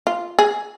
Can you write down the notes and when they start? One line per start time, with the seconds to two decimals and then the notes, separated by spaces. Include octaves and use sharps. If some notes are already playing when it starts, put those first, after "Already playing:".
0.07 F4
0.39 G#4